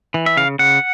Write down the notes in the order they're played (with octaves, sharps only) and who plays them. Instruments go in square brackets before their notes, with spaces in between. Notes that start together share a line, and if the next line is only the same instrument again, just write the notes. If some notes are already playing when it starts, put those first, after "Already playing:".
[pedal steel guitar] E3
E5
C#3 F5
C#3 F#5